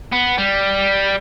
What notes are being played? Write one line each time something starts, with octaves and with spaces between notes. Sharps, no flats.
B3
G3